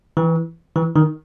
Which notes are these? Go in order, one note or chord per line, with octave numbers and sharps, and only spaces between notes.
E3
E3
D#3